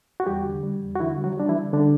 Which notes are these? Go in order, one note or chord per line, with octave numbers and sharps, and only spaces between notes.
F#4
E2 G3 G4
D3
G3
E2
F#4
D3 E3 E4
G3
F#3 F#4
G3 D4
E3 E4
D3
D3 G3 D4